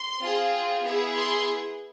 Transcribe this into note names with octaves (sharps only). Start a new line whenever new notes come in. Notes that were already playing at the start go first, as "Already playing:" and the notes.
Already playing: C6
C4 F4 G#4
B3 E4 G#4
C6